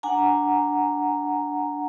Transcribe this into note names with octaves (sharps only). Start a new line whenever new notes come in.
D4 F#5 G#5 A#5